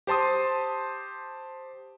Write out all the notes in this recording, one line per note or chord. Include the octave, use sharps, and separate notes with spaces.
G4 C5 A5 C6 D#6